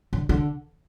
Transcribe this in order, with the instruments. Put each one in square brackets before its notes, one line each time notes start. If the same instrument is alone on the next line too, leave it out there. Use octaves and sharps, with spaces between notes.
[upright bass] D3
D3